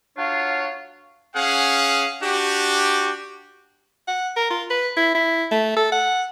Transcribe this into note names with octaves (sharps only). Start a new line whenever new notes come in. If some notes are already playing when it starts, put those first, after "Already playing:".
F#3 D4 F4 C#5 F5
C#4 G#4 F5 F#5
D4 F#4 G4
F#5
A#4
F4
B4
E4
E4
A3
A4
F#5